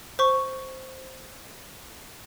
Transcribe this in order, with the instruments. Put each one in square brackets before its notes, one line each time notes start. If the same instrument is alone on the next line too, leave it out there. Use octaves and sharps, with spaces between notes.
[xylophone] C5 C#6